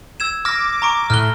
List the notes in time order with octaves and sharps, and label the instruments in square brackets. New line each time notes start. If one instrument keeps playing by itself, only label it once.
[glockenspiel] E6 G#6 E7
[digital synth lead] D6 [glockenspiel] F6 A#6
[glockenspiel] A#5 C#6 D7
[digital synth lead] A2 [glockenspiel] F6 F#6 G7